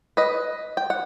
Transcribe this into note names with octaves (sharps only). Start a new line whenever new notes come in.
B4 D#5
G5
F#5